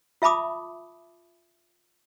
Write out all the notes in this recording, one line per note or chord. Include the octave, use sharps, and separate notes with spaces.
F4 E5 A5 B5 D6 D#6